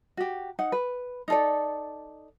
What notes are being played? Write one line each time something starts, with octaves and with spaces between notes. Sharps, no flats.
F#4 G4
D#4 F#5
B4
D#4 A4 D5